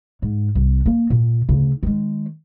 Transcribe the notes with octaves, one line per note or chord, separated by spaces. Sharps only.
G#2
C2
A#3
A#2
D2 C#3
D#3 G#3